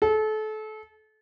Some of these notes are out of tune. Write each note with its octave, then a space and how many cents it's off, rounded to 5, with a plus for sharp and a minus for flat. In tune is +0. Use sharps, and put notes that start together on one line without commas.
A4 -30